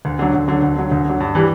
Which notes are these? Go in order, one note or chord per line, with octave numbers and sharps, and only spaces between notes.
D2
D3 F#3
D2
D3 F#3
D2
D3 F#3
D2
D3 F#3
G2
E3 G3